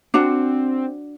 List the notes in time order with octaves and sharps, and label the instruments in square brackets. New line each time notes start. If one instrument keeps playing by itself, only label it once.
[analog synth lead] C4 [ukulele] D4 F#4